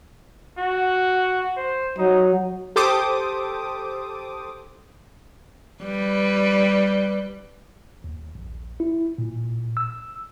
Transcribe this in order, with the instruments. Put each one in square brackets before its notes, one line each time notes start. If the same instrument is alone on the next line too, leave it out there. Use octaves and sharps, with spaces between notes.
[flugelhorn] F#4
C5
[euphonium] F#3 [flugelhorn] D#4
[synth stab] G4 A4 C5 D6 D#6
[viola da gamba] G3 B4
[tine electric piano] D#2
A#1
E4
A#2
E6